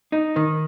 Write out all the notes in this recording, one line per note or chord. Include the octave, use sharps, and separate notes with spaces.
D#4
D#3